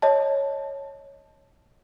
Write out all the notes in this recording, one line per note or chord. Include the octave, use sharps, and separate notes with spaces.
C#5 D#5 A5